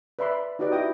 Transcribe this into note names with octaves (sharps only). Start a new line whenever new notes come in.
B4 D5 E5 B5 C6
D#4 F#4 G4 B4 D5 D#5
E4 F#4 D#5 G5 D#6